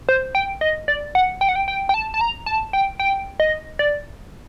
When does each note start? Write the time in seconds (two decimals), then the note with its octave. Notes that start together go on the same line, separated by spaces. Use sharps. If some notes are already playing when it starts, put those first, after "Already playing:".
0.09 C5
0.35 G5
0.61 D#5
0.88 D5
1.15 F#5
1.41 G5
1.49 F#5
1.56 G5
1.68 G5
1.89 G5
1.94 A5
2.14 A5
2.21 A#5
2.46 A5
2.73 G5
3.00 G5
3.40 D#5
3.79 D5